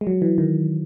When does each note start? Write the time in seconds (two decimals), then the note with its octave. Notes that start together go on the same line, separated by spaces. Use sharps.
0.01 G#3
0.07 F#3
0.22 E3
0.38 D#3